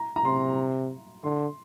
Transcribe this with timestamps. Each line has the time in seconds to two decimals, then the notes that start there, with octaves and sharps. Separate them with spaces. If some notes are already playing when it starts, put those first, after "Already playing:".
Already playing: A#5
0.16 A#5
0.24 C3 C6
1.24 D3 C6